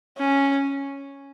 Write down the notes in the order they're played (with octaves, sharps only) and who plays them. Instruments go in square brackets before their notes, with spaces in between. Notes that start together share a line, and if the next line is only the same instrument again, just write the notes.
[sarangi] C#4